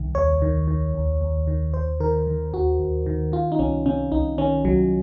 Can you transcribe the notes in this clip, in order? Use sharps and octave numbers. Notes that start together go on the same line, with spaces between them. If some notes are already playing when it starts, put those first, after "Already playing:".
Already playing: C2 D#3
D#2 C#5
D#3
D#3
D#2
D#2
D#3
D#2 C5
D#3 A#4
D#3
D#2 F#4
D#2
D#3
D#3 F4
D#4
C2 C#4
C3 C#4
C2 D#4
D#3 C#4
C2 F#3